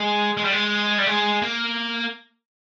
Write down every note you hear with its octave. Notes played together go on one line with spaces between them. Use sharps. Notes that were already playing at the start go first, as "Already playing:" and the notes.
Already playing: G#3
G#3
G3
G#3
G3
G#3
A#3